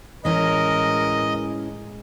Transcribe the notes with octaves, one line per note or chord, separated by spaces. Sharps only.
A2 E3 G#3 C#4 A#4 D#5